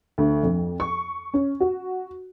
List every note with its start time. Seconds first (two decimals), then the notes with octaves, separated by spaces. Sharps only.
0.18 D2
0.43 F2
0.80 C#6
1.34 C#4
1.60 F#4